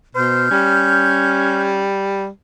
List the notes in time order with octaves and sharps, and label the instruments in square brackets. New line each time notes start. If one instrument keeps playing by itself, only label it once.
[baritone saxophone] B2 [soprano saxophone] C5 [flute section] F6 G6
[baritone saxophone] G3 [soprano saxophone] C#4